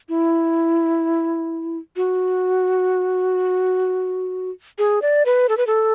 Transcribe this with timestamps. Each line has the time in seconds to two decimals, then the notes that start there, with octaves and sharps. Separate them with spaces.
0.09 E4
1.96 F#4
4.78 G#4
5.02 D5
5.26 B4
5.49 A4
5.57 B4
5.67 A4